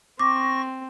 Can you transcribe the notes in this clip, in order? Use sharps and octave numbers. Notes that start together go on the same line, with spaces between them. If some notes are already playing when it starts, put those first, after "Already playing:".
C4 C#6 D6 A#6